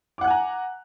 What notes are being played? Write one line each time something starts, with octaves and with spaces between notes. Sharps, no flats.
F#5 G#5 A#5 D6 F#6